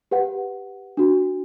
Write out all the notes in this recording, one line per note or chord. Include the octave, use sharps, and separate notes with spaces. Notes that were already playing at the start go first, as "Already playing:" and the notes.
G4 B4 F#5
D4 F#4